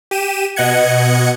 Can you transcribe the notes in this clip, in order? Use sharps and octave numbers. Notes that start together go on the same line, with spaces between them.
G4 D#7 E7
B2 D#5 F#5 F#6 G#6 C#7